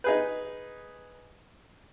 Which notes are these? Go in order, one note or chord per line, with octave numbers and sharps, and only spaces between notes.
D#4 G#4 B4